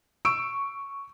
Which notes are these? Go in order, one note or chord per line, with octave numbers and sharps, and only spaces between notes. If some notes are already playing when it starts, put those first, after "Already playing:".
C#6 E6 D7